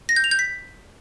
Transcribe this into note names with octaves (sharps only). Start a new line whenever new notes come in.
A#6
G6
F7
G6
B6